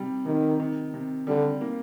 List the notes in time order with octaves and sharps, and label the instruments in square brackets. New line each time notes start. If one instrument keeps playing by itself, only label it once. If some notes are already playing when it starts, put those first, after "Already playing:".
Already playing: [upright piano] C3 G3
[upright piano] C3 [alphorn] D#3
[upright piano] D#3
C3
[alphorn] D3 [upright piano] G3
[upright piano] A#3